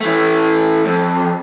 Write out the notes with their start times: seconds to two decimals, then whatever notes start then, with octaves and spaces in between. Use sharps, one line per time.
0.01 E3 A3
0.85 F2